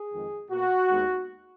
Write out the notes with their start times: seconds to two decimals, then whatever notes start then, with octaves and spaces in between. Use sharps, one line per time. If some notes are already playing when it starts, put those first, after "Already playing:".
Already playing: G#4
0.12 F2 D#3 G#3
0.51 B2 A#3 F#4
0.89 D#2 D#3 G#3 B3